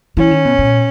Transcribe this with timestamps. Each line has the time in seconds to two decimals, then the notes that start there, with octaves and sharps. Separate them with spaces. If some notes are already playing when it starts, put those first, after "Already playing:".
0.17 E3 C#4
0.31 D#3
0.45 B2
0.59 A#2